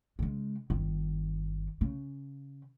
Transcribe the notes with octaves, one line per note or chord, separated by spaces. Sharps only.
C#3 G#3
G1 D#3
C#3